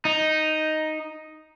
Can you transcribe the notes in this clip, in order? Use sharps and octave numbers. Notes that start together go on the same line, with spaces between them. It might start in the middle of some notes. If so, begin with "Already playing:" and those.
D#4